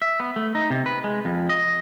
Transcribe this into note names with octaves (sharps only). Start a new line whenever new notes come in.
E5
B3
A3
D#4
C3
B4
G#3
F2
D#5